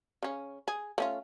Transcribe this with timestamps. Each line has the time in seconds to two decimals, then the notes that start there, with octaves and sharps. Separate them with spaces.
0.23 C#3 C#4
0.68 G#4
0.98 A3 C#4 F4